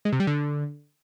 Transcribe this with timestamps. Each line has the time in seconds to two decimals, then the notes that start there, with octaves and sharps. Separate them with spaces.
0.05 G#3
0.13 C3
0.20 G3
0.27 D3